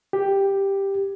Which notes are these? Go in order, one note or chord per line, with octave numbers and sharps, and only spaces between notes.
G4